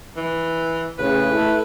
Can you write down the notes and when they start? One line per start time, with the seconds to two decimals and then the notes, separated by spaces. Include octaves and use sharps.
0.17 E3
0.99 A2 C#3 B4
1.32 A3 E4